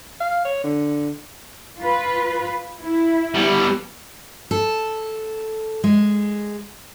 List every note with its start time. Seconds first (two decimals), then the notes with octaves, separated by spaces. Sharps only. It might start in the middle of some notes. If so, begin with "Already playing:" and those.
0.20 F5
0.44 C#5
0.64 D3
1.81 F4 B4
2.81 E4
3.34 G3 B3
4.51 A4
5.84 G#3